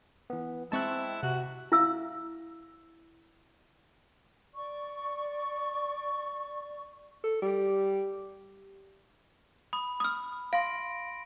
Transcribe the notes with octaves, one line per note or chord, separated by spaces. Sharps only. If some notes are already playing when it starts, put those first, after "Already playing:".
E3 B3
G#3 C4 E4 A5 C#6 F#6
C3 F#4
E4 E5 F5 E6
D5 C#6
A4
G3
B5 D#6
D#6 F6
F5 C6 A#6 D7